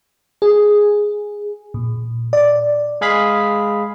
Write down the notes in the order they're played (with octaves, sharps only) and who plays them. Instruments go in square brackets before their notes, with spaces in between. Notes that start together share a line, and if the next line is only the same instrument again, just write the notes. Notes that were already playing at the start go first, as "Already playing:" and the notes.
[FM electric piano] G#4
A#2
D5
[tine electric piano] G#3 G#4 F5 B5 B6